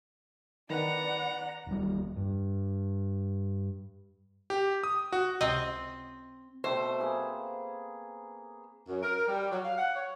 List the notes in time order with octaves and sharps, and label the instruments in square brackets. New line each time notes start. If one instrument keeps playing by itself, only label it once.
[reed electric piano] D#3 [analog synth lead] B4 [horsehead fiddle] D5 F#5 [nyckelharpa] A#5
[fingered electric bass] E1 G3
G2
[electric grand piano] G4
D#6
F#4
[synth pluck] C#2 C3 D#5 [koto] C4
[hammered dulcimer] B2 A3 C4 [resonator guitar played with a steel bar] C5
[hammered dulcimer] A#3 G#4 B4
[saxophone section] F#2
A#4
G3
F#3
F5
F#5
C#5